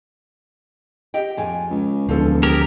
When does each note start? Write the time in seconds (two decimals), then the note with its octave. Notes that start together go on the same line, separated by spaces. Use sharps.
1.14 G4 D#5 G5
1.37 F2 G#5
1.70 C#2
2.09 E1 D2 F3 A4
2.43 G4 G#4 A#4